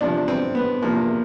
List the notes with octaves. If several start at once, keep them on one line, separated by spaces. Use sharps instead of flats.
E2 C3 F3 D4
C4
B3
E2 C3 F3 A#3